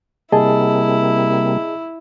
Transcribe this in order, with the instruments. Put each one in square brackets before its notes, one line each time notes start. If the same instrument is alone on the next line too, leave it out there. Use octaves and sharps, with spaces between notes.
[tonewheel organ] C3 G3 A#3 [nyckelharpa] E4 [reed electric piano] G#4 D#5 A5